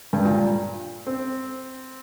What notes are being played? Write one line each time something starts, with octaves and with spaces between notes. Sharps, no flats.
G2
A#2
C4